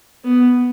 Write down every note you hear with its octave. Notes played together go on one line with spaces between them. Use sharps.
B3